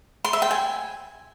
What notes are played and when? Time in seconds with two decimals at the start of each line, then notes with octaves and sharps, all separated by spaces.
0.25 C6
0.33 E5
0.42 G5
0.51 G#5